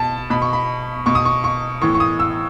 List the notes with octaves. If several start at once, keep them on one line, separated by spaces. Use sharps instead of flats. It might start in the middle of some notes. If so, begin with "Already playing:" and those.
Already playing: B2 A5
B2 B5
C#6
B5
B2 C#6
D#6
C#6
C#6
A2 E3 C#6
C#6
D#6
E6